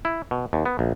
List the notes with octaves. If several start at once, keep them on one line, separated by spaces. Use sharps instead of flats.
E4
B2
D#2
B3
A#1